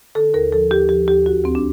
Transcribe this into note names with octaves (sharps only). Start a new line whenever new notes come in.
D3 A4
D#2 A#4
F3 A4
D#2 G4
F3 G4
D#2 G4
D2 F#4
D2 C4
D4